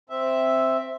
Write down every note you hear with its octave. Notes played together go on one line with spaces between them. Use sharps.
C4 E5